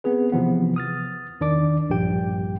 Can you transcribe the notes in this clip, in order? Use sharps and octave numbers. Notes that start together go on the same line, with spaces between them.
B3 C4 G#4 B4
C3 E3 F3 B3
D#6 F6 A6
E2 D#3 D4 D5 D6
A#1 G2 G3 G4 G5